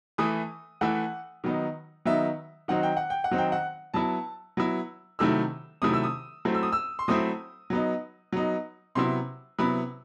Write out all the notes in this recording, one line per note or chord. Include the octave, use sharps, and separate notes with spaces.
E3 A3 E4 D#6
E3 A3 E4 F#5
D#3 F#3 B3 D#4
D#3 F#3 B3 D#4 E5
D#3 F#3 C4 D#4 F#5
G5
F#5
G5
F#5
D#3 F#3 C4 D#4
G5
F#5
F#3 B3 E4 A5
F#3 B3 E4
C3 D#3 F#3 A3 E4 E6
C3 D#3 F#3 A3 E4 D#6
E6
D#6
F#3 A3 C4 E4
E6
D#6
E6
C6
F#3 A3 C4 E4 D#6
F#3 B3 D#4
F#3 B3 D#4
C3 F#3 B3 E4 C6
C3 F#3 B3 E4 B5